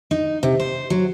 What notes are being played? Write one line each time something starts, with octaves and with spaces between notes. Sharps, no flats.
D#4
C3
C5
F#3